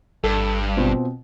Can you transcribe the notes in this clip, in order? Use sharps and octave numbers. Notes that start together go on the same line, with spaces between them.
G#1 G2 A4
B2 C4 F4